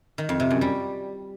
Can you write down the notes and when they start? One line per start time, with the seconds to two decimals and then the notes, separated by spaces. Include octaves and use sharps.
0.18 D#3
0.29 F2
0.40 C3
0.51 F#2
0.61 G3